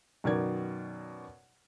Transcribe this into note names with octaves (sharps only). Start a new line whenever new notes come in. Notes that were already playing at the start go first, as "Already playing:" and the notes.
F#2 B2 D#3 A#4 D5 G#6